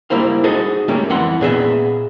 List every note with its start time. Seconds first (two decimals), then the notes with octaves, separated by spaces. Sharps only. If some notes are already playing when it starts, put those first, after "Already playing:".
0.10 G3 A#3 E4 C5 F5
0.44 D#4 F#4 G#4 A4 C5 D#5
0.88 G3 A3 A#3 C#4
1.10 F2 E3 F#5 C6
1.41 A#2 B3 G#4 D#5 E5